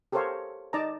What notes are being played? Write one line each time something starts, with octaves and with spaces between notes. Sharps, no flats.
G4 A4 A#4 C5 C#5 F5
D#4 D5 D#5 A5 A#5